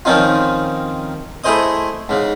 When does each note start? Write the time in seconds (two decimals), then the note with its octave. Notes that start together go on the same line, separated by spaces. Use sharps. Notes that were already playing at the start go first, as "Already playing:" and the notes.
0.05 D#3 F3 C4 C#4 D#4 F4
1.44 A3 E4 G#4 C5 D#5 D#6
2.09 G#2 C#3